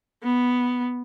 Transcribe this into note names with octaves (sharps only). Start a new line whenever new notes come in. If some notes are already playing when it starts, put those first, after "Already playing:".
B3